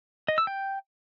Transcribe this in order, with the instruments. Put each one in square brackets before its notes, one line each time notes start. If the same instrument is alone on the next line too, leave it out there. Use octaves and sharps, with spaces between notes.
[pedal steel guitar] D#5
E6
G5